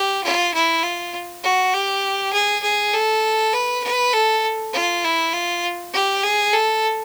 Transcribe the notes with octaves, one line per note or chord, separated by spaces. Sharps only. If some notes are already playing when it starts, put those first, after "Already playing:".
Already playing: G4
F4
E4
F4
F#4
G4
G#4
G#4
A4
B4
B4
A4
F4
E4
F4
G4
G#4
A4